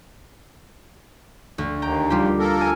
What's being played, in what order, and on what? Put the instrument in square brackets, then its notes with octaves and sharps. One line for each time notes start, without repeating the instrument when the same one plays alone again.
[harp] D2
[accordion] D#2 [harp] G5 A#5
[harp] G3 F4 G4
[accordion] A#3 A4 A#4
[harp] G#5 F6